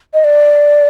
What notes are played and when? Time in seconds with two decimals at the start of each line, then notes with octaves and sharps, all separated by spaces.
0.14 D#5
0.24 D5